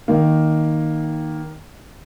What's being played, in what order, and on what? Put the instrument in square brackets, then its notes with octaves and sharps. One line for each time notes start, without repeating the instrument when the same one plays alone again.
[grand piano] D#3 A#3